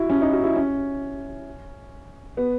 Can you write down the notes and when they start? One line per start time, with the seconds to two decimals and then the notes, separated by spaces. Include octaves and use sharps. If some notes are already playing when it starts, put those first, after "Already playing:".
Already playing: E4 F#4
0.10 C#4
0.22 D#4
0.32 F#4
0.44 E4
0.56 C#4
2.37 B3